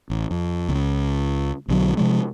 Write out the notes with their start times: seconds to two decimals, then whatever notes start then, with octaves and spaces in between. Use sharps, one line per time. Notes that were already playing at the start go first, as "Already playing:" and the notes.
0.10 A1
0.31 F2
0.69 C#2
1.68 B1 D3 F3 F#3
1.97 C3 F3 G#3